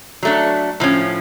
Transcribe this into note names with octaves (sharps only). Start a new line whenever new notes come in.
F#3 A3 D4
A2 F3 C#4